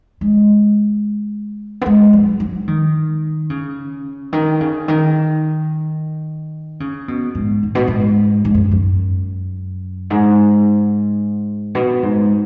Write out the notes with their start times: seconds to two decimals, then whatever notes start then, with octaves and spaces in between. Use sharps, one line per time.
0.21 G#3
1.81 B3
1.86 G#3
2.13 F#3
2.40 F#3
2.68 D#3
3.50 C#3
4.33 D#3
4.61 C#3
4.88 D#3
6.80 C#3
7.08 B2
7.35 G#2
7.63 G#2
7.75 B2
7.88 G#2
8.45 G#2
8.54 F#2
8.71 F#2
10.10 G#2
11.75 B2
12.03 G#2